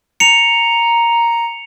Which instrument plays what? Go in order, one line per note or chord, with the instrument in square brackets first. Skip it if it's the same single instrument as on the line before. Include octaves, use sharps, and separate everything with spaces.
[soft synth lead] A#5 [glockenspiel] C#7 F7